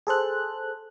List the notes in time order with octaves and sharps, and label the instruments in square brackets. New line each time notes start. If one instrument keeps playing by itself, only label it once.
[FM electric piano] G#4 A4 C5 F#6